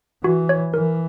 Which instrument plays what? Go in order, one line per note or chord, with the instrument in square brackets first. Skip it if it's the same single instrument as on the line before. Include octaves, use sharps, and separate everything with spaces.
[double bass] E3 [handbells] F#4
[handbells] C#5
[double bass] E3 [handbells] A#4